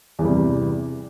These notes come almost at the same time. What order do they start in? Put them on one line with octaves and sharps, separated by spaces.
E2 G2 G3 C3